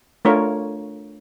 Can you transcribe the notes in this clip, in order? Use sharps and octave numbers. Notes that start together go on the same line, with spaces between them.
A3 D4 F4 A#4 C#5